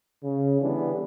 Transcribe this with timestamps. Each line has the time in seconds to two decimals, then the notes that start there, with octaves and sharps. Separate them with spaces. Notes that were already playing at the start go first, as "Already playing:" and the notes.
0.23 C#3
0.61 D3 E3 G3 B3 D4